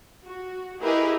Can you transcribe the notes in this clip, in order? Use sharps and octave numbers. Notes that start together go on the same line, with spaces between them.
F#4
E4 G4 G#4 A#4 B4 D#5